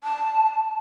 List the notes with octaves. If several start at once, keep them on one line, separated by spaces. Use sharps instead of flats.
A5